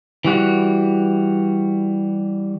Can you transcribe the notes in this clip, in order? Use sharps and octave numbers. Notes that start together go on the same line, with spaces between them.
E3 G3 F#4